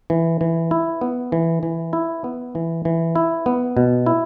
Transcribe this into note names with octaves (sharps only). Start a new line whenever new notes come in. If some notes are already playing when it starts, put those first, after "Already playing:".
E3
E3
E4
B3
E3
E3
E4
B3
E3
E3
E4
B3
B2
E4